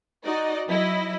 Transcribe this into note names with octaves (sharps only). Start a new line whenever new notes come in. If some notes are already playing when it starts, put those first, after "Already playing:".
D#4 F#4 D5 D#5
F#3 E4 D#5